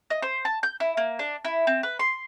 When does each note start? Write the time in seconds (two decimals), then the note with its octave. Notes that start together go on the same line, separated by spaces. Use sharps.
0.10 D#5
0.22 C5
0.45 A5
0.63 G6
0.80 E4
0.97 A#3
1.19 D4
1.45 E4
1.67 C4
1.83 B4
1.99 C6